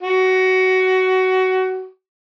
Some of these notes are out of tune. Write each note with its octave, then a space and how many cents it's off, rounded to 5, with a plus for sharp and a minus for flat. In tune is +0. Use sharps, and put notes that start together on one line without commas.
F#4 +20